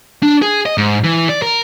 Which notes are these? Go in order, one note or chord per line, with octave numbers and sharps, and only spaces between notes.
D4
G#4
D#5
G#2
E3
D5
A#4